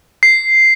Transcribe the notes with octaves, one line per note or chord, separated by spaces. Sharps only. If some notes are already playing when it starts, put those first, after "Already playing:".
C7